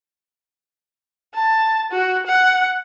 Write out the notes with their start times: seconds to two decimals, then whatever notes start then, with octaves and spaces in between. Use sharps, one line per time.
1.35 A5
1.92 F#4
2.27 F#5